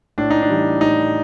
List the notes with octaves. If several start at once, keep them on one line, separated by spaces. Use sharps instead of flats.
A2 D4
D#4
D4
E3 G3
A2 D#4